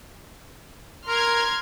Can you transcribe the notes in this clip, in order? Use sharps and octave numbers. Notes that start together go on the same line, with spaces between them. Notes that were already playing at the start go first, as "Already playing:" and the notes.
A#4 C6 F6 G#6